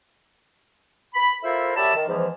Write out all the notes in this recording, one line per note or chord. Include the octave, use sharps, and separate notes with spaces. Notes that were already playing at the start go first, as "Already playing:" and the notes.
B5
E4 F4 A4 A#4 C5 E5
F#2 G4 D5 E5 A5 B5
D#3
E2 G#2 E3 F3